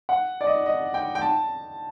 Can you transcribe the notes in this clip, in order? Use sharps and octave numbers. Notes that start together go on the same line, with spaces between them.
F#5
D5
D#5
D#5
G5
G5
A5